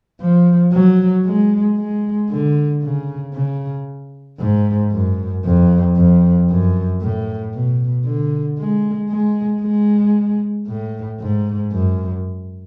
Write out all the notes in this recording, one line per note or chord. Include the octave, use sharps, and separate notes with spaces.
F3
F#3
G#3
G#3
D3
C#3
C#3
G#2
F#2
F2
F2
F#2
A2
B2
D3
G#3
G#3
G#3
A2
G#2
F#2